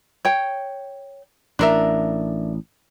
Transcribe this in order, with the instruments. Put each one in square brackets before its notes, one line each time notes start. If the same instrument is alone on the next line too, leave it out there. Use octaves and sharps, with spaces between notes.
[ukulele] C#5 G5
[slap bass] A1 [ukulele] D4 A#4 E5